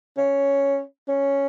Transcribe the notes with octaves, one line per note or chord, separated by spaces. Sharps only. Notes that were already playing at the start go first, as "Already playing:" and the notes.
C#4
C#4